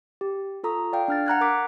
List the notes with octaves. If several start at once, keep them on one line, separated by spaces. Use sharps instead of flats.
G4
F4 A4 A#5 C#6 D#6
D5 F5 G5
D4 F6 A6
F#5 A#5 F#6 G#6
A#4 D6 B6